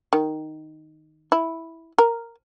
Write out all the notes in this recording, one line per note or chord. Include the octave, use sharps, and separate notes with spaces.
D#3
E4
A#4